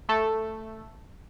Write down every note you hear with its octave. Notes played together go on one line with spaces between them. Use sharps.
A3 A4